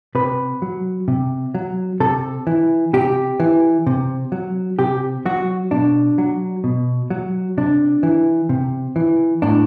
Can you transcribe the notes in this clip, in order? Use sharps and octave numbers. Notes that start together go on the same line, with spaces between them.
C3 B4
F#3
C3
F#3
C3 A4
E3
C3 G4
E3
C3
F#3
C3 G4
F#3 F#4
B2 D4
F#3
B2
F#3
C3 D4
E3
C3
E3
A2 D4